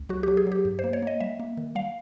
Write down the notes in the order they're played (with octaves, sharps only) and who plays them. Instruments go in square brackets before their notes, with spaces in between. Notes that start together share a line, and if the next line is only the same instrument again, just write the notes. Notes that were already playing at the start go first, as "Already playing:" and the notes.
Already playing: [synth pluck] C#2
F#3 F#4
F#3 G4
G#4
F#3 G4
G2
C5
A#3
C#5
A#3 D#5
G3 E5
A#3
D#3
G3 F5